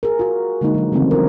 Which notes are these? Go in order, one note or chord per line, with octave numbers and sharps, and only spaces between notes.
G#4 A#4
F4 F#4
D3 G#3 A#3 D#4
F3 F#3
C#3 E3 A3 C4 D4
F4 A#4